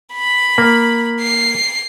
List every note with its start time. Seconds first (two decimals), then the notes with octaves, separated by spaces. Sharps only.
0.14 B5
0.58 A#3
1.20 C7